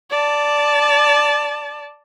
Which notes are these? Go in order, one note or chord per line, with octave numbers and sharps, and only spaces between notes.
D5 A5